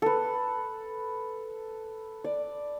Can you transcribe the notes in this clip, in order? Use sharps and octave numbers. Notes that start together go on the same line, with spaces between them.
A4 B4
D5